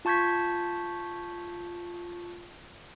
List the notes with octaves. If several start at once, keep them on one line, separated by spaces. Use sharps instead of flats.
F4 A5 C#6 G6 G#6 B6